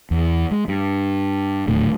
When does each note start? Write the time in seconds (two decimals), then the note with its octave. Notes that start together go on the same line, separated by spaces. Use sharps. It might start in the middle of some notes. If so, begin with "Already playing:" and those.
0.11 E2
0.51 G#3
0.68 G2
1.68 D#1 D2 A2